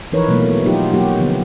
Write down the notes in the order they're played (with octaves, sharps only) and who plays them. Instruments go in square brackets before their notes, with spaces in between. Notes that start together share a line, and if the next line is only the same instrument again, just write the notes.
[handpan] E3 F3 D#4 A#4 B4 C#5
B2 E3 F#3 A3 A#3
F#3 B3 D#4 F4 G4
F#3 A#3 F#4 G4
D3 F3 B3